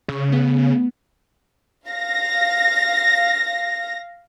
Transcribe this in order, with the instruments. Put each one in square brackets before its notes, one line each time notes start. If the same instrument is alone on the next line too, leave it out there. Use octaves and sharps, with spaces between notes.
[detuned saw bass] C#3 [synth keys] C#6 E6
[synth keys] A3 B3
[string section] F5 A#6